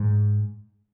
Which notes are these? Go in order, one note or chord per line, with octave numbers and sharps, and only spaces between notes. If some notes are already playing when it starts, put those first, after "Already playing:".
Already playing: G#2